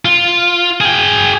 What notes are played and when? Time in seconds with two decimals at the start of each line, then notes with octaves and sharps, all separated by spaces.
0.05 F4
0.81 G#4 G5